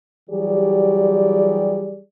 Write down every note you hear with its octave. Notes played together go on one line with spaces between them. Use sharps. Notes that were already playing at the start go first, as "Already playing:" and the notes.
E3 F#3 G3 G4 G#4 D5